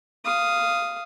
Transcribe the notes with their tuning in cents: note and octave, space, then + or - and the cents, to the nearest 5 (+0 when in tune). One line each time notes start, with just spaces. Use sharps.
F5 -10 D#6 +0